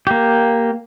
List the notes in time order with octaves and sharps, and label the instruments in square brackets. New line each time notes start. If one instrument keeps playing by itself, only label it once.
[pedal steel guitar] A#3 G4